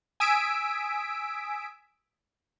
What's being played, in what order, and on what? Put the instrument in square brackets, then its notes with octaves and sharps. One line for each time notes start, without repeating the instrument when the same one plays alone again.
[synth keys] G#5 D#6 E6 B6 D7